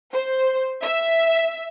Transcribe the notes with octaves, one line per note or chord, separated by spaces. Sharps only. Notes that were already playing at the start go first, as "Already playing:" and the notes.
C5
E5